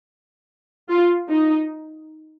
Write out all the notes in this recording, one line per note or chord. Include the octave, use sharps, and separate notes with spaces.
F4
D#4